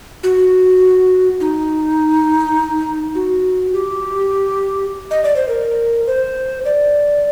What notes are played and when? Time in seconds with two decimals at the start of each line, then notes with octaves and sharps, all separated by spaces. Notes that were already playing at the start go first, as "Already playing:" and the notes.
0.23 F#4
1.40 D#4
3.15 F#4
3.73 G4
5.11 D#5
5.24 D5
5.36 C5
5.48 A#4
6.07 C5
6.65 D5